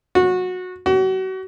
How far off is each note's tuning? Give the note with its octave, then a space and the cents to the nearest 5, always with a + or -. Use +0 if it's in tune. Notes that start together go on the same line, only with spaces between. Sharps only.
F#4 -20
F#4 +35